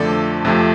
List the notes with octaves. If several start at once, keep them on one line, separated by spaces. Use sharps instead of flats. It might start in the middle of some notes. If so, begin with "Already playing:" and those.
Already playing: F2 D3 F3 A3 A4 D5
F2 C3 F3 A3